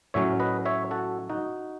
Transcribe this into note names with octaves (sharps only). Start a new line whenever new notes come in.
A2 F#3 C#4 C#5 E5
B4 D#5
C#5 E5
F#4 A4
D#4 F#4